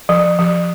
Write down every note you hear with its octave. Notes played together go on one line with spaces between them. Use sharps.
F3
F3